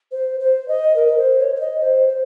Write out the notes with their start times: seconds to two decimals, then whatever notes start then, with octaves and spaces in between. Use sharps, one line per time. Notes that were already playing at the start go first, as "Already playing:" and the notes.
0.11 C5
0.39 C5
0.68 D#5
0.96 A#4
1.07 A#4
1.17 C5
1.39 C#5
1.55 C#5
1.60 D#5
1.80 C5
2.09 C5